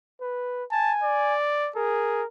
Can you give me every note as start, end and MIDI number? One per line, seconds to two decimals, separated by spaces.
0.21 0.64 71
0.71 1.35 80
0.71 0.93 81
1.04 1.70 74
1.76 2.22 68
1.76 2.26 70